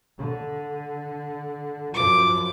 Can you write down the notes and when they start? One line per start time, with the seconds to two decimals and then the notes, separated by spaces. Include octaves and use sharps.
0.17 D3
1.94 F#2 F3 F#3 D6